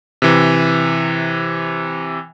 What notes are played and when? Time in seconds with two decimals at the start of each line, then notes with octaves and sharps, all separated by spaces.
0.22 C3 E3